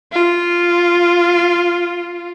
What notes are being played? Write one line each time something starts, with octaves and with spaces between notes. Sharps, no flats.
F4